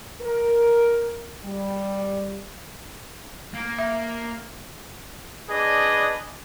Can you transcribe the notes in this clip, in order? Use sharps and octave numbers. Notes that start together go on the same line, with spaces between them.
A#4
G3
A#3
E5
D4 G#4 B4 D5 D#5